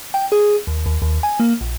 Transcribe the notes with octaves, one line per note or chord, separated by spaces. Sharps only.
G5
G#4
D#2
D#2
D#2
G#5
A#3
A#1